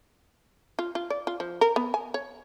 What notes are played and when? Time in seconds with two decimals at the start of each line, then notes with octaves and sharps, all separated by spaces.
0.79 F4
0.95 F4
1.10 D5
1.27 F4
1.40 F3
1.61 A#4
1.76 B3
1.94 G#5
2.14 C#5